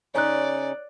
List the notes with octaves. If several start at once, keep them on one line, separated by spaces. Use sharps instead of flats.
C#3 C#4 D#4 C#5 D5 F#6